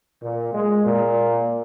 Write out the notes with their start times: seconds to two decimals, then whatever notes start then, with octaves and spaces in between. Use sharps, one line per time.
0.23 A#2
0.54 G#3
0.85 A#2